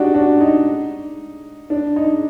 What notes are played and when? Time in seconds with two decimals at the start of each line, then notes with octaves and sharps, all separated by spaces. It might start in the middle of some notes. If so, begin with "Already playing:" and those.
Already playing: D4 D#4 F#4 G4
0.14 D4 F#4
0.41 D#4
1.70 D4
1.96 D#4